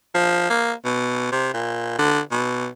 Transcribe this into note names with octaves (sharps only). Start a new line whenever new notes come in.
F3
A#3
B2
C3
A#2
D3
B2